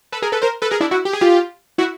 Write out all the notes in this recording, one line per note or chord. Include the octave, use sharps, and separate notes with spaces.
A4 B4
G#4 A#4
A4 B4
A#4 C5
A4 B4
G#4 A#4
D4 E4
E4 F#4
G4
G#4
F4 G4
E4 F#4